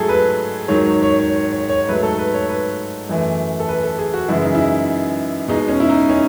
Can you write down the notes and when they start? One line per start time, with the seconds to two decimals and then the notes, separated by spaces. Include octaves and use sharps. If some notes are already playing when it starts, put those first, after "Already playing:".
Already playing: G#2 F#3 A3 G#4 A4
0.09 B4
0.68 G#2 D#3 F#3 C#5
0.86 C#5
1.03 C#5
1.19 C#5
1.36 C#5
1.52 C#5
1.69 C#5
1.88 G#2 F#3 A3 B4
2.03 A4
2.19 B4
2.34 C#5
2.49 B4
3.09 F#2 E3 A3
3.60 A4
3.69 B4
3.84 A4
3.99 G#4
4.14 F#4
4.28 F#2 C#3 E3 G#3 E4
4.42 D#4
4.55 E4
5.48 B2 G#3 D#4
5.68 C#4
5.80 E4
5.89 D#4
6.09 C#4